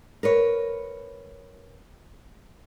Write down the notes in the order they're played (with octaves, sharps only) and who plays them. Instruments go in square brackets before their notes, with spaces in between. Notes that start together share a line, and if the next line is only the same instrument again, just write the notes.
[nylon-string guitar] A#4 B4 C#5